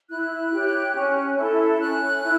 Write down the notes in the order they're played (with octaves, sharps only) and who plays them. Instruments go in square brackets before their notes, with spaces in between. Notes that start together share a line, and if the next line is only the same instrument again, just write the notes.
[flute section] E4 F#6
G4 C#5
C#4
E4 A4
C#4 F#6
E4